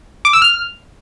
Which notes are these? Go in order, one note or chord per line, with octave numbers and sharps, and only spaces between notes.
D6
E6
F6